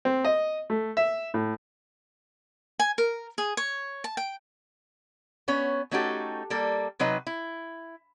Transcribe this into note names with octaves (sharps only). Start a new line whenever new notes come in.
C4
D#5
A3
E5
A2
G#5
A#4
G#4
C#5
A5
G5
B3 C#4 C#5
A3 C#4 D#4 F#4 G4 A4
G3 A#3 A4
C3 F#3 D#4 B4 D#5
E4